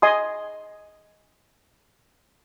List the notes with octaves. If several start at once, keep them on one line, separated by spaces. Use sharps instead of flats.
D#5 G#5 C6 D#6